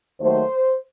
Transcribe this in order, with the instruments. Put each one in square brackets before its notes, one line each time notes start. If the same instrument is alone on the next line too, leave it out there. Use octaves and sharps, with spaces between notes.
[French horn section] D#2 D#3 F#3 A3 C5